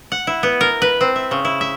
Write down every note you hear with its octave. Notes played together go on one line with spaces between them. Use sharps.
F#5
E4
B3
A#4
B4
C4
E5
C#3
E4
E5